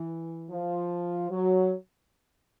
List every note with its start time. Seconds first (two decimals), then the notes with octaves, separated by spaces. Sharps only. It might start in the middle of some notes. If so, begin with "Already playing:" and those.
Already playing: E3
0.51 F3
1.30 F#3